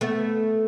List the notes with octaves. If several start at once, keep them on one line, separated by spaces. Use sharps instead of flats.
A3 B3